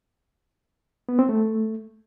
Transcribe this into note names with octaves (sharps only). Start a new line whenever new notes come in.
B3
C4
A3